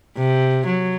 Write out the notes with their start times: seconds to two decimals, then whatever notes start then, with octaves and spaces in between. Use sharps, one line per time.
0.17 C3
0.66 F#3